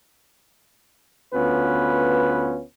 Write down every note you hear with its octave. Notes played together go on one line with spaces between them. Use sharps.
D2 B3 C#4 F4 B4